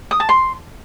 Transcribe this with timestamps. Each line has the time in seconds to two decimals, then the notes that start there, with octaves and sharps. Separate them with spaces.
0.11 D#6
0.20 A5
0.29 C6